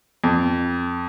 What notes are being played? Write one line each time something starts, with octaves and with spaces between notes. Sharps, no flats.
F2